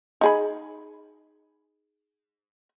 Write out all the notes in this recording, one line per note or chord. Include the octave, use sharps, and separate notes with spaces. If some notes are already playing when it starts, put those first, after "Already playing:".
D#4 G#4 B5